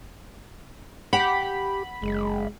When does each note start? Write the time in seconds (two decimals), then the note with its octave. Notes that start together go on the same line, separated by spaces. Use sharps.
1.13 G4 F#5 B5
2.02 F#1 G#3